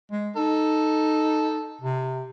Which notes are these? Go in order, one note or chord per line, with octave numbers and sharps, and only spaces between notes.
G#3
D#4 A4
C3